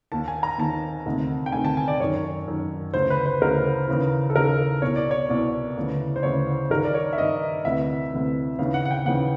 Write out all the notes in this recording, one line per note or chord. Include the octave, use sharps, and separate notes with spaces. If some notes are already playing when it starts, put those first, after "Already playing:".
D#2 D#3 A5
G#5
A#5
D#2 D#3 A5
D2 C3 D#3
G5
D2 C3 D#3 G#5
A5
G#5
D5
F#2 D#3 C#5
F#2 D#3
D2 C#3 E3 C5
B4
C5
D2 C#3 E3 A#4
D#2 C#3 E3
A4
D#2 C#3 E3 A#4
C2 B2 C#5
D5
C#5
C2 B2 D5
D2 C#3 E3
C5
D2 C#3 E3 C#5
G2 D#3 A#4
D5
C#5
E5
G2 D#3 D#5
D2 C3 E3 E5
D2 C3 E3
D#2 C#3 E3 F5
F#5
F#5
G5
D#2 C#3 E3 F#5